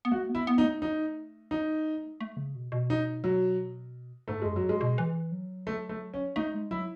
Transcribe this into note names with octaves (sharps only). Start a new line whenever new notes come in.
B3
A3 F#4
B3
E4
B3
D#4
A3
D#4
D#4
A3
C#3
B2
B2
D#4
F#3
G#2 A3
F#2 G#3
F#3
G#2
G#3
B2
E3
F#3
A3
A3
C#4
A3 D#4
G#3
F#3 E4